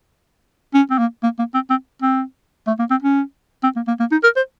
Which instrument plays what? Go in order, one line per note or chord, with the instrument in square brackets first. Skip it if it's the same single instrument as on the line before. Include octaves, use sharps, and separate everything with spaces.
[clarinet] C#4
C4
A#3
A#3
A#3
C4
C4
C4
A3
A#3
C4
C#4
C4
A#3
A#3
A#3
D#4
A#4
C5